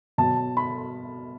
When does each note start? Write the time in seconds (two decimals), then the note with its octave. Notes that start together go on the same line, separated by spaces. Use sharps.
0.18 B2 F#3 A5
0.57 B5